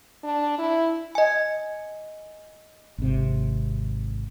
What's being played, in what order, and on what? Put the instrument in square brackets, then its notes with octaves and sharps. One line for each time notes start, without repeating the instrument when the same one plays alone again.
[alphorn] D4
E4
[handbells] D#5 G#5
[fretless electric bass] G#1 C3